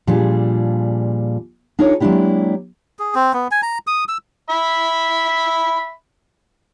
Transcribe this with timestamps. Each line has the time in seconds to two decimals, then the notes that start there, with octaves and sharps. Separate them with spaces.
0.07 A#2 F3 G3 D4 G#4
1.79 D4 D#4 F4 G#4 A#4 C#5
2.00 F#3 G#3 A#3 D4 E4 G4
2.99 G#4
3.15 C4
3.33 B3
3.51 G#5
3.62 A#5
3.87 D#6
4.08 E6
4.50 E5 B5